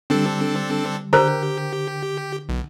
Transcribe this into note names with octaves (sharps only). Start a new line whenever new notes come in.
D3 G3 C4 D4 A4
D3 G4 A#4 C5 A#5
B1